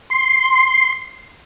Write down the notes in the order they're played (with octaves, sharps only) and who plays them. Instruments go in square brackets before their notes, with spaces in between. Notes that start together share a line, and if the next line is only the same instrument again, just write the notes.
[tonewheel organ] C6